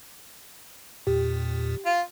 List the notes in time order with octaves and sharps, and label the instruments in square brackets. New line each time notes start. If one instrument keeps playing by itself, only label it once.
[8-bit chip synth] E2 A#2 [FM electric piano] G4
[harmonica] F4